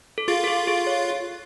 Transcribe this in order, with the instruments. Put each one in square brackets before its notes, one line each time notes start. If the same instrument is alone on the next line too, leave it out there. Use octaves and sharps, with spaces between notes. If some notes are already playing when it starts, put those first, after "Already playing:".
[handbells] A4
[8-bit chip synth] F4 [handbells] G#4
[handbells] A4
G#4
G#4
C#5